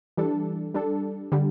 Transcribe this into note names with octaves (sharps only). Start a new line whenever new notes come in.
E3 G3 D4 A4
G3 D4 A4
D3 G3